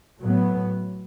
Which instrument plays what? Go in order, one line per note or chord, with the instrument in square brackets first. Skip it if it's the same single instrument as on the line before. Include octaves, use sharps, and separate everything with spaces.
[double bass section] A2 F#3 B3